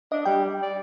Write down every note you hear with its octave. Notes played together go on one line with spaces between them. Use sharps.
D4 D#5
G3 G5
D5